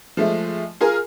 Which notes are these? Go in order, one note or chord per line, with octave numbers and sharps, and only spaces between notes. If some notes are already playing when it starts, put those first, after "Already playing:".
F3 G#3 A3
F4 G#4 A#4 G#5